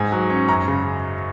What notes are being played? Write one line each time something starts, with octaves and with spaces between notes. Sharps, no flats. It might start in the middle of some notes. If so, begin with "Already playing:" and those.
Already playing: G#2 G#5
F#3
C#4
F#2 A#5
C#3